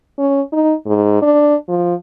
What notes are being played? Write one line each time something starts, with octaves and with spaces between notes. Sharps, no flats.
C#4
D#4
G#2
D4
F3